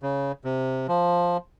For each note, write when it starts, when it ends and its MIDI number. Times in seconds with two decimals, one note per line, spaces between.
0.03 0.32 49
0.44 0.87 48
0.88 1.37 53